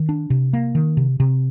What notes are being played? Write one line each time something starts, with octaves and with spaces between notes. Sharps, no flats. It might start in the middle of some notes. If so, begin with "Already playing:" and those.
Already playing: D#3
D4
C3
A#3
D#3
C3
C3